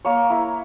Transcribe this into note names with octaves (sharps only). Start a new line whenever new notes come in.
A#3 C#5
E4 A#4